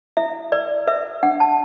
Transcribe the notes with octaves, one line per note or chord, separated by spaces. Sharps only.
E4 E5
B4 D5
B4 E5
D4 F#5
A5